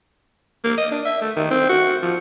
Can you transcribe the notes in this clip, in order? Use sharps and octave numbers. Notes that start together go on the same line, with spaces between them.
A#3
D#5
D4
E5
A3
D#3
C4
F#4
F3